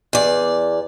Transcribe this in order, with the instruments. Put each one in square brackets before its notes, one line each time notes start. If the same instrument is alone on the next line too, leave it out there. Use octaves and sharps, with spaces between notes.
[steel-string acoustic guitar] E2 D5